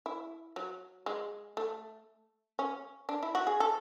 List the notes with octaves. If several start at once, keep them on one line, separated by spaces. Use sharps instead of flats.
E4
F#3
G#3
A3
C#4
D4
E4
F#4
G#4
A4